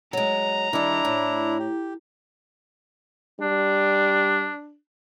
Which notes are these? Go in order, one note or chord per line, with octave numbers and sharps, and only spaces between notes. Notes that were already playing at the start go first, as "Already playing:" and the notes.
F#3 G#3 A#5
D#3 G3 D4 E4
A2
G4
G3 D4